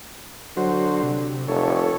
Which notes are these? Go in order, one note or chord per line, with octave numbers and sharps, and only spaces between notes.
D3 F#3 F#4 C5
C3
F1 A4 C#5